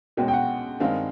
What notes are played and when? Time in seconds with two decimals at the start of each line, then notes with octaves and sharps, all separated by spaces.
0.17 B1 B2 G#3 C#4 F#4 G5
0.28 G5
0.33 F#5
0.80 G2 D#3 G#3 C4 F5